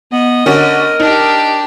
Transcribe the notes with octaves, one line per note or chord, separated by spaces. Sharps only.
B3 D#5
D3 C#4 F#4 A#4
D4 D#4 G4